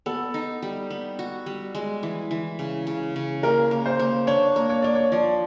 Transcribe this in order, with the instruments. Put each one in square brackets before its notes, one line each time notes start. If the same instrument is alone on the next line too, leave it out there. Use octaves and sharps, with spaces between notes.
[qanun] B3 [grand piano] A4
[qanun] D#4
G3
B3
F#4
G3
G#3
E3
E3
C#3
C#3
C#3
[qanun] A#3 [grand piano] A#4
[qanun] A#3
[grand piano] C5
[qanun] A#3
[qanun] D4 [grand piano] C#5
[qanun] A#3
[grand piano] C#5
[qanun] A#3 [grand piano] D5
[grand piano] C#5
[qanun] F3 [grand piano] D5